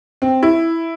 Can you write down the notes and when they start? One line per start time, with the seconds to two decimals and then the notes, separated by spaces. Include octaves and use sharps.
0.22 C4
0.43 E4